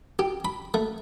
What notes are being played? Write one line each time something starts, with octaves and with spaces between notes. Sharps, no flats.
G4
B5
A3